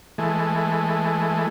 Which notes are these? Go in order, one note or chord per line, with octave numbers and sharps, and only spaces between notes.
E3 G#3 A3